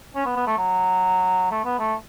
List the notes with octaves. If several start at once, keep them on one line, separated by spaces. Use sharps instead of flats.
C#4
B3
B3
A3
F#3
A3
B3
A3